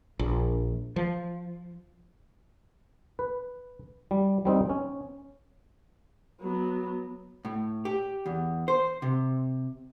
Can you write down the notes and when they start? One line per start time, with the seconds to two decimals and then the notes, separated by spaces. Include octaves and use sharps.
0.19 A#1
0.96 F3
3.19 B4
4.11 G3
4.45 G3 C4 D#4
4.70 C#4
6.41 F#3 B3
7.45 A2
7.85 G4
8.26 E2
8.68 C5
9.02 C3